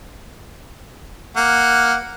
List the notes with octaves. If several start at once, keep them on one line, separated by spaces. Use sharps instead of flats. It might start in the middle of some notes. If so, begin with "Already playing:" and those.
A#3 F#5